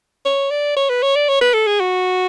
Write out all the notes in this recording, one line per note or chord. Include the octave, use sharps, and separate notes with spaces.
C#5
D5
C#5
B4
C#5
D5
C#5
B4
A4
G#4
F#4